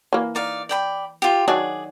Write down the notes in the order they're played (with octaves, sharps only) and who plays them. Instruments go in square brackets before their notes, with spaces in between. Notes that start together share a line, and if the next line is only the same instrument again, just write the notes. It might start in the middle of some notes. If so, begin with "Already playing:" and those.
[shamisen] E3 A#3
[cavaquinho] D#4 D5 F5
D5 G5 B5
F4 G4
[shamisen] D#3 F#3 D4 [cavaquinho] G#4 D5